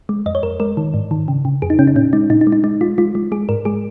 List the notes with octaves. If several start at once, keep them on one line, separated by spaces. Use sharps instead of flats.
G#3
F2 D#5
C#5
F2 A#4
G#3 A#4
D#3
G#2
D#3
C#3
C#3
F2 G#4
D#4
C#3 C#4
D#4
A#2 C#4
G#3 D#4
A#2 D#4
D#4
G#3
D#4
G#3 D#4
G#3 F4
G#3 F4
G#3
G#3 G#4
G#2 A#4
G#3 G#4